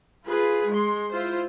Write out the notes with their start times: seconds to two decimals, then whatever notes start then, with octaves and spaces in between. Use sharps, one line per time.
0.25 F4 G#4 B4
0.69 G#3 C6
1.11 E4 F4 C5